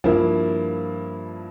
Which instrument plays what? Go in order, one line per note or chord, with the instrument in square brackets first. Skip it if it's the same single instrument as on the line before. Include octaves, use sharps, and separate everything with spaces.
[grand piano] G2 F3 A#3 E4